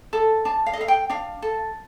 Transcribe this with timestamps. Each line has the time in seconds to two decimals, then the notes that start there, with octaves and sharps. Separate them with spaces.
0.13 A4
0.45 D4 A5
0.66 F5
0.73 D#5
0.77 A4 F5
0.88 G5
1.10 D4 F5
1.42 A4